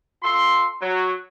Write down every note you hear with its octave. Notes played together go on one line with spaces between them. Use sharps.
F4 A4 C6
F#3